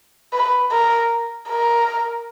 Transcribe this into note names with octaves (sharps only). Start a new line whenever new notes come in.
B4
A#4
A#4